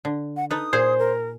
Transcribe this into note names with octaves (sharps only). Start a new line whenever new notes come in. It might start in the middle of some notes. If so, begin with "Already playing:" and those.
D3
F#5
D#4 A4 B4 D#6
A#2 G#4 C5
A#4